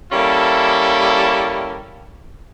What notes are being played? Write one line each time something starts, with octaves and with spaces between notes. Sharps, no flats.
G3 A#3 C#4 E4 A4